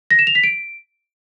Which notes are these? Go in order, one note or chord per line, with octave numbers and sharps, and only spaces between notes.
A#6
E7
F7
B6
D7